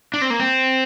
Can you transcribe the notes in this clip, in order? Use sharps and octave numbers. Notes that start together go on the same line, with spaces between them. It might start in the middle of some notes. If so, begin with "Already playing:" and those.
D4
C4
A#3
C4